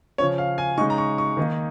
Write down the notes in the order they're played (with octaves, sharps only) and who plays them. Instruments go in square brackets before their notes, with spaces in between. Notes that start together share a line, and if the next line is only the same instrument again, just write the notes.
[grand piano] C#3 F3 C#4 C#5
F5
G#5
C#3 G#3 D#4 C#6
A#5
C#6
C#6
D#3 A#3 D#4